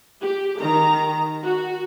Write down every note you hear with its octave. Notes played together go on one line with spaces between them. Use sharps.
G4
D#3 A#5
F#4